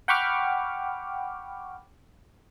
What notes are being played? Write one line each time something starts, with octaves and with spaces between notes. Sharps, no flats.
F#5 G5 B5 C#6 D6 F6